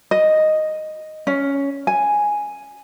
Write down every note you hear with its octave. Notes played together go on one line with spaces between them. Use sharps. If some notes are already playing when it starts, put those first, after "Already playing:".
D#5
C#4
G#5